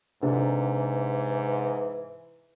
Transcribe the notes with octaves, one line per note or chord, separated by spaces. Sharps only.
G#2 C3 E3 D4 A4